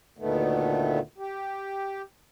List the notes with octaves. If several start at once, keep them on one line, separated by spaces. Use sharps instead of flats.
D2 A#2 D#3 A3 B3
G4